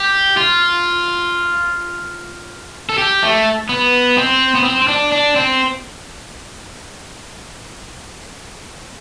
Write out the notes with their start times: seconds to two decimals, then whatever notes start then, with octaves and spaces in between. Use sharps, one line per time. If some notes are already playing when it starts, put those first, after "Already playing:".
Already playing: G4
0.37 F4
2.89 A4
2.98 G4
3.23 A3
3.69 B3
4.18 C4
4.55 B3
4.64 C4
4.82 C4
4.88 D4
5.12 D4
5.36 C4